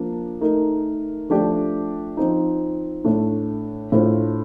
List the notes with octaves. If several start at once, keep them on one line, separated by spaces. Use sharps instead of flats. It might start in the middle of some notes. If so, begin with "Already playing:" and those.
Already playing: F3 A#3 D4
A3 D#4 A#4
F3 A3 D4 G4 D5
F3 C4 D#4
A2 A3 D4
A2 A3 D4 F4 C5